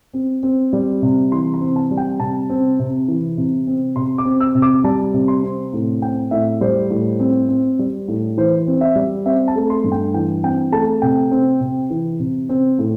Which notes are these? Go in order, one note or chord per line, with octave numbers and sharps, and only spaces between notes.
C4
C4
G3
C3
E3 C6
C6
C4
A5
G3
G5
C3 A5
C4
C3
E3
C3
C4
C3 C6
D6
C4
E6
C3
D6
G3 A5
C3
C6
C4
A2
C4 G5
A2 E5
G3 C5
A2
C4
C4
G3
A2
E3 C5
C4
E5
G3
C4 E5
A5
A3
C6
G2
G5
E3 G5
C4 G5
A3 A5
C3 G5
C4
C3
E3
C3
C4
A2